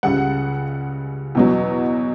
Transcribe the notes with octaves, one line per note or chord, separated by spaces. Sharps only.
C#2 C#3 G3 F#5
E2 B2 F#3